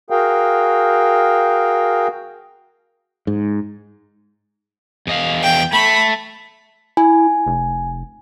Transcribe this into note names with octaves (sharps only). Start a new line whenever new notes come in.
F#4 G#4 A#4 F5 G5
G#2
E2 D#5 F5
G5
A3 B5
E4 G#5
F1